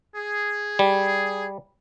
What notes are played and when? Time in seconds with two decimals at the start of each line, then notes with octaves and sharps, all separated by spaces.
0.16 G#4
0.79 G3